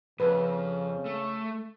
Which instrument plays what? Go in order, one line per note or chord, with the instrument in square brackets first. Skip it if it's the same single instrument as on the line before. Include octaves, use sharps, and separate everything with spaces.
[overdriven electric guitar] F2 [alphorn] C#3 [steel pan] B4
[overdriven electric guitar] A3